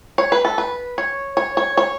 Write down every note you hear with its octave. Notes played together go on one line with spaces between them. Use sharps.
C#5
B4
A4
B4
C#5
C#5
C#5
C#5